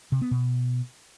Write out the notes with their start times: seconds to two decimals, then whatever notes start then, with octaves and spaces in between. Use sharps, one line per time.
0.12 C3
0.22 B3
0.31 B2